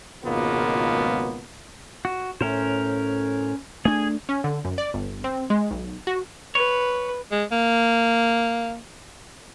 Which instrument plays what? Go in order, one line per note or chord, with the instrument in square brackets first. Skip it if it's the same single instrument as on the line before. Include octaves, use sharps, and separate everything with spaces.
[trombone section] G#1 C#2 B2 A#3 B3 F4
[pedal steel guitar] F#4
[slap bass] A2 [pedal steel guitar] C#4 A#4 C5
[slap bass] A3 D4 [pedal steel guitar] G#4 G#5
[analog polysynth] C#4
D3
F#2
D5
G1
C4
G#3
B1
F#4
[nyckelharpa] B4 [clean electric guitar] C#5
[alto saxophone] G#3
A#3